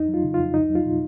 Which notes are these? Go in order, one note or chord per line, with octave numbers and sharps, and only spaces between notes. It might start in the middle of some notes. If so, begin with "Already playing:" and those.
Already playing: F2 D#4
F#3
F4
C#3
F2 F4
C#2 D#4
F#3
F4
B2